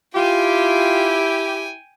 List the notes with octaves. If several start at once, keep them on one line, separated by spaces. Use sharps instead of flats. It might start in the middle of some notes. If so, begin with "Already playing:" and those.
E4 F4 G4 G5 G#5